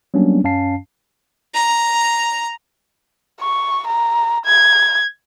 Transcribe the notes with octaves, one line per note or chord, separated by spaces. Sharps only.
F#3 G3 A#3 B3 C#4 D4
F#2 C#4 F5 A5 C7
A#5
C#6
A#5
G#6